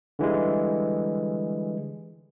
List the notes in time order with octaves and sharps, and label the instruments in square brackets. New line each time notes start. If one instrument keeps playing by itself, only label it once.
[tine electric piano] D3 E3 G3 G#3